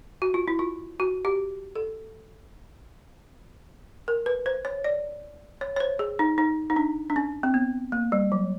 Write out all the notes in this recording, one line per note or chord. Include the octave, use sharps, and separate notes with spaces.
F#4
F4
E4
F4
F#4
G4
A4
A#4
B4
C5
C#5
D5
C#5
C#5
C5
G#4
D#4
D#4
D#4
D4
D4
C#4
C4
B3
A#3
G3
F#3